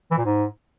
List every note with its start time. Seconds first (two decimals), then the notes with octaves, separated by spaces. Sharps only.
0.11 E3
0.18 A#2
0.25 G#2